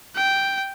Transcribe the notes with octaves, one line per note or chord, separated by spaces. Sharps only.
G5